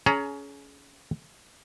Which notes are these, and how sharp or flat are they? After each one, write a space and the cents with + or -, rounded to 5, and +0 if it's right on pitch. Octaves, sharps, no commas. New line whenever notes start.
C#4 +20 G#4 +30 A#5 +0